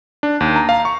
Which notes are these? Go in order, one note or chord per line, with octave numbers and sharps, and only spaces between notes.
D4
D#2
A#5
F5
C#6